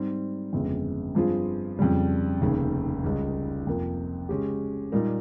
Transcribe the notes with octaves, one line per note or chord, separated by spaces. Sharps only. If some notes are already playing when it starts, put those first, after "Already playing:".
Already playing: G#2 G3 C4
G1 F2 C#3 G#3
G2 F3 C4 F4 G#4
F2 C#3 G3
F1 D#2 C#3
C#2 C#3 G3
F2 C3 F3 A#3
C#3 G#3 C#4 G4
A#2 G3 A#3 D#4 A#4